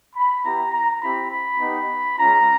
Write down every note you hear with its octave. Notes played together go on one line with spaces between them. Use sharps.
B5
B3 E4 G4 A#5
A#5
C4 E4 G4 B5
B5
B3 D#4 G4
G#3 C#4 F4 A#5